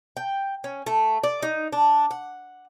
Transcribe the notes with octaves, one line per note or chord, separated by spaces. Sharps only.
G5
C#4
A3
D5
D#4
D4
F#5